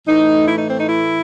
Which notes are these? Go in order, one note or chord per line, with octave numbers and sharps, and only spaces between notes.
A2 E3 A3 D#4
E4
D#4
C4
D#4
E4